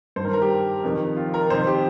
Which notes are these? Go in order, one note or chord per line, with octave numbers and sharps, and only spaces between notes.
G2 D#3 A#4 C5
A#4
G4
F2 C3 D#3
F4
A#4
F2 C3 D#3 C5
G4